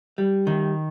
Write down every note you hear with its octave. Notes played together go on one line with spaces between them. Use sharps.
G3
D#3